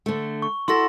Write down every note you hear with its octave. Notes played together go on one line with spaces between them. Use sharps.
D3 A3
C#6
E4 F#4 A4 C6 A#6